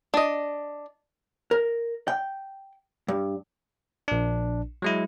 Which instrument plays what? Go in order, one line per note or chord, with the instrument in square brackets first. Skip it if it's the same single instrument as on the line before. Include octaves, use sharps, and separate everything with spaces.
[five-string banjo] D4 D#5
[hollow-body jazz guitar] A#4
G5
G2
[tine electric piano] A#1 D4
F#3 G#3 E4